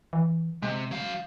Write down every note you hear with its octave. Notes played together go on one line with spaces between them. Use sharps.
E3
C3 G#3
F#3 F5